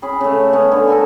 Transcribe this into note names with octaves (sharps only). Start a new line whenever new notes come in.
C#4 G#4 B5
C#3 A3
B3 C#4 A4 G#5
D3
A4 A#4 G#5 A5